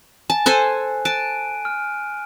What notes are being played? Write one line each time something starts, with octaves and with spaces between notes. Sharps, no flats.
G#5 A5
A4 C5 G#5 F#6
A5 F#6 D7 D#7
F6